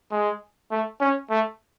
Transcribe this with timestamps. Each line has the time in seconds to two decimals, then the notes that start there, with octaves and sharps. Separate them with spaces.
0.12 G#3
0.71 A3
1.01 C#4
1.31 A3